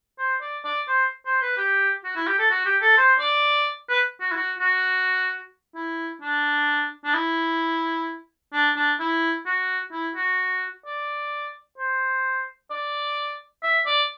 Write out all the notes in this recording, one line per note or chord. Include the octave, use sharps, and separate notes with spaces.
C5
D5
D5
C5
C5
B4
G4
F#4
E4
G4
A4
F#4
G4
A4
C5
D5
B4
F#4
E4
F#4
F#4
E4
D4
D4
E4
D4
D4
E4
F#4
E4
F#4
D5
C5
D5
E5
D5